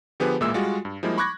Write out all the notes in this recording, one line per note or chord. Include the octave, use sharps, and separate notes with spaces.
D3 F3 B3 G4 G#4 B4
A1 A#2 G#3 A#3 E5 E6
G3 G#3 F4 F#4
G2
F3 G3 G#3 A#3 D#4 E4
B5 C#6 D6 F#6 G#6 A#6